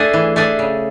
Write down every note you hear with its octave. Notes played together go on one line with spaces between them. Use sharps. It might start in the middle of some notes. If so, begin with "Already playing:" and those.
Already playing: A3 D4 G#4
E3
A3 D4 G#4
C#3